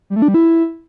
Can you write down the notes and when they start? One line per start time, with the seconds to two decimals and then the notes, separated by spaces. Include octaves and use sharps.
0.10 G3
0.16 A3
0.22 D4
0.28 G3
0.34 E4